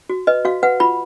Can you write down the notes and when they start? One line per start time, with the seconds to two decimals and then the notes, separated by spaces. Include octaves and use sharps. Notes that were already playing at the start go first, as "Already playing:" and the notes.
0.10 F#4
0.27 B4 D#5
0.45 F#4 F5
0.63 B4 F#5
0.80 F4 B5